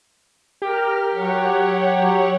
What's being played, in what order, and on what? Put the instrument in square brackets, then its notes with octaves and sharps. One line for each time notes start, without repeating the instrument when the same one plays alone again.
[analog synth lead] G4 [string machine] A#4 F6
[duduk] F#3 [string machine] C#5 F#5
[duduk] F#3